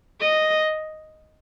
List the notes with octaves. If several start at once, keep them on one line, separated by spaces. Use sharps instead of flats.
D#5